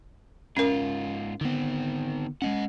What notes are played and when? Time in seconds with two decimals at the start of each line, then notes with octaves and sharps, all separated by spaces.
0.57 G#2 C#4 F4 A#4
1.41 D3 D#3 B3 C4
2.42 G#3 B3 C#4 D#5 F#5